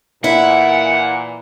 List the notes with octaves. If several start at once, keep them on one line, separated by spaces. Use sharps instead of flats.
A#2 E3 E4 F#5